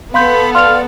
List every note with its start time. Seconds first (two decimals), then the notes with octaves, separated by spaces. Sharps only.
0.14 B3 A4 F5 B5 C6 G6
0.55 D5 F5 C6 F7